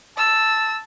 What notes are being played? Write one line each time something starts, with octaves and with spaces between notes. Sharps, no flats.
A5 E6